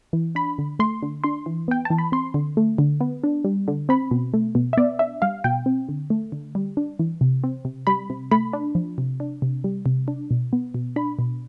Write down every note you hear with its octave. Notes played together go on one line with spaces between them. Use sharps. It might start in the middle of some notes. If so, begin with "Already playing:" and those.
E3
D4 B5
D3
A3 C6
D3
D4 C6
E3
B3 G5
E3 A5
B5
C4 C6
D3
A3
D3
B3
D4
G3
D3
C4 B5
B2
A3
B2
E5
B3 D5
D4 E5
G3 F5
B2 G5
C4
D3
A3
D3
G3
D4
E3
C3
C4
C3
G3 B5
C3
A3 B5
D4
F3
C3
D4
C3
G3
C3
D4
B2
B3
B2
D4 B5
B2